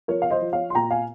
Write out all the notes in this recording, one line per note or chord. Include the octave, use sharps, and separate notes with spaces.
F3 A#4 C#5
F5
C5 D#5
F3
C#5 F5
C6
A#2 G5 A#5
F5 G#5